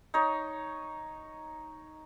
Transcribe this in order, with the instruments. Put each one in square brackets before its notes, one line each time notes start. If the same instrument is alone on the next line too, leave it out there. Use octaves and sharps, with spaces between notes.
[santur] D#4 C#5